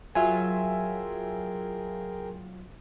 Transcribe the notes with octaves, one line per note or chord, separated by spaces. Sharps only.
F#3 F4 G#4 A#4 E5 G5 G#5